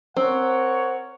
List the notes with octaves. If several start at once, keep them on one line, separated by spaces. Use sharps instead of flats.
C4 A#4 C#5 F#5